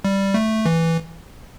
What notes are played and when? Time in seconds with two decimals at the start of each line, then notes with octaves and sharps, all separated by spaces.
0.05 G3
0.34 A3
0.66 E3